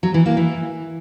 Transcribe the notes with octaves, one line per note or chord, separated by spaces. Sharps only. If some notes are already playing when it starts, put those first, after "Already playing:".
F#3
E3
A#3
E3